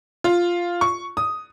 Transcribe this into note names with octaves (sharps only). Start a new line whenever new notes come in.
F4
C#6
D#6